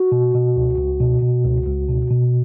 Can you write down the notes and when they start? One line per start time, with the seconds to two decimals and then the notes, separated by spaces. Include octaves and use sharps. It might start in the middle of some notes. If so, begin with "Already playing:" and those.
Already playing: F#4
0.12 B2
0.34 B2
0.57 C#2
0.78 C#2
1.00 B2
1.22 B2
1.45 C#2
1.66 C#2
1.89 B2
2.10 B2